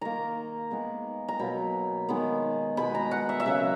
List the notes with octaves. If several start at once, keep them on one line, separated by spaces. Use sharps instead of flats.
D#3 A#3 A#5
D#3 G#3 B3
A#5
B2 F#3 A#3 B5
D#3 G#3 B3
B2 G#3 B3 B5
A#5
F#5
E5
E5
C#3 F#3 A#3 F#5